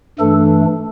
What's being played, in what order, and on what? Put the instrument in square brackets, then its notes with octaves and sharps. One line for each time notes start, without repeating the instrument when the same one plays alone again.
[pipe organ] G2 E3 A3 D4 A4